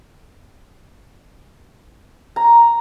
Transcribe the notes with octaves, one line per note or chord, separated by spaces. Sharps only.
A#5